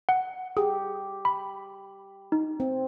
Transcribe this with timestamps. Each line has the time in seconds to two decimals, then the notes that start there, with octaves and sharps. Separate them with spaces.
0.09 F#5
0.57 G4 G#4
1.25 B5
2.32 D#4
2.60 C4